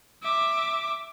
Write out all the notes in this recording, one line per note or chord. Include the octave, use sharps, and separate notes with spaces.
E5 D6